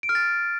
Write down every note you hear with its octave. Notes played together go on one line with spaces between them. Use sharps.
D7
F6
A6